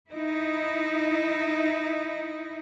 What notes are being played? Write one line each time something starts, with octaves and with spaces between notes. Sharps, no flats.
D#4 E4